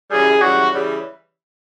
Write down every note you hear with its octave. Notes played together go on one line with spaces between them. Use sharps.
F#2 C#3 E3 G3 G#4
F#2 C#3 E3 G3 F#4
C#3 E3 G3